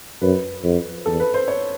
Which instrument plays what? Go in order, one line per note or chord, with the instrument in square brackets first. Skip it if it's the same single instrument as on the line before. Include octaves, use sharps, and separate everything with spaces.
[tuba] F#2 [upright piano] B4
[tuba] F2
[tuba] E2 [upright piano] A4
[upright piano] B4
C5
C#5